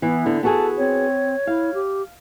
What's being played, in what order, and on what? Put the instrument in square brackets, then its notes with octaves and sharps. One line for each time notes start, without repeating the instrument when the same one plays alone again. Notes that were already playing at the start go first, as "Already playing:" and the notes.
[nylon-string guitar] E3 [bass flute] B3 [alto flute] E4
[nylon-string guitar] D3
[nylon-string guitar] B3 F#4 G#4 [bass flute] A4 [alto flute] A5
[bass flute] C4 [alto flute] C#5
[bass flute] E4 [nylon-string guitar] F5
[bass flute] G4